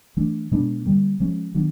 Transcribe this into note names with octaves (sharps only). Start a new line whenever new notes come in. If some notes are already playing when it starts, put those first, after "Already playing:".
E3 A3 D4
B2 G#3 B3 D4
D3 G3 A#3
F3 G#3 C#4
D#3 F#3 B3 D4